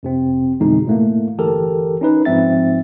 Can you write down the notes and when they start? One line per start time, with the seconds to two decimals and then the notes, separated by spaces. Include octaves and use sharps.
0.03 F2 C3 C4
0.61 F2 B2 D3 E3 G#3 D#4
0.87 A2 A3 A#3
1.38 G1 E3 G4 A4 A#4
2.01 C#4 D#4 B4
2.25 G#2 F3 C4 E5 A6